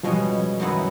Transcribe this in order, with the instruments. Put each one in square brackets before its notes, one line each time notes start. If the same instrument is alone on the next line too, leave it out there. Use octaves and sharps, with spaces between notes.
[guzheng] B2 G#3 C#4 [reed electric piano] F3 G3
[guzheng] F#2 D#3 F#3 B3 E4